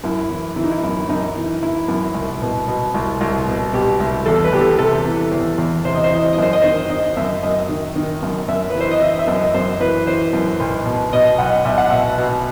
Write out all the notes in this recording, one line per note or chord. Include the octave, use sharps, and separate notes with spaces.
F#2 E4
E3
E3 E4
D#4
E4
F#2
F#2 D#4
E3
E3 E4
F#2
C2
B2
B2
C2
C2
B2
B2 G4
C2
E2 A4
B4
E2 G4
A4
C3 A4
E3
E2
E2
C3 C5
D#5
C5
E3 D#5
C5
D#5
F#2 C5
D#5
D#3 C5
D#3 D#5
F#2 E5
F#2 D#5
D#3
D#3
F#2
F#2 E5
E3 B4
C5
D#5
E3 E5
E5
F#2
D#5
F#2 C5
E3 B4
E3 C5
F#2
B1
B2
B2 D#5
B1 F#5
B1 E5
F#5
B2 E5
B2